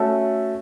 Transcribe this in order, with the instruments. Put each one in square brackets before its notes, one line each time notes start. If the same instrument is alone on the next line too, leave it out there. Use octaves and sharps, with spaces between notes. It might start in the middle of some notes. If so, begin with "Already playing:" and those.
Already playing: [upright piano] A3 C#4 F#4 A4